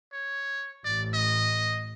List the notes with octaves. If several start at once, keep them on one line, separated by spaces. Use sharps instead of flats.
C#5
A1 D5
D#5